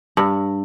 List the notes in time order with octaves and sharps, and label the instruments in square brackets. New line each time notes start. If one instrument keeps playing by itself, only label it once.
[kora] G2